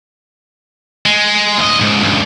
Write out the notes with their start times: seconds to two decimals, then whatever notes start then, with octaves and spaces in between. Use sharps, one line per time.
1.06 G#3
1.58 D2 D#5
1.81 C#2 G#2
2.01 C#2 G2